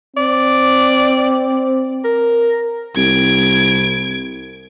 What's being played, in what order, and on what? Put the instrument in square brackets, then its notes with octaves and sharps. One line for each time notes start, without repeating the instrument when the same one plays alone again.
[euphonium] C4 [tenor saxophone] D5
[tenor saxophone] A#4
[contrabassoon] C2 [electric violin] G#6 D7